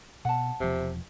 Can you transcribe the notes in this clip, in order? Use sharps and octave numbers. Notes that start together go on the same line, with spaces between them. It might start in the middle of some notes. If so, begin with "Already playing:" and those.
B2 F#5 A5
E1 C3 F3